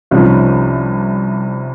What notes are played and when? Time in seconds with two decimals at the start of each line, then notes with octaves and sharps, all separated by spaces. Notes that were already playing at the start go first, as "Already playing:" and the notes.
0.11 C2 C3 F3 C#4 D#4